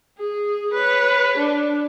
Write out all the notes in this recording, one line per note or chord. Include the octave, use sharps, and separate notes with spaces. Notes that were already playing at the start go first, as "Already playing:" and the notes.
G#4
B4 C#5
D4